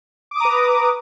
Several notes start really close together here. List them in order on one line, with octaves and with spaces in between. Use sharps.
D6 D#6 A#5 B4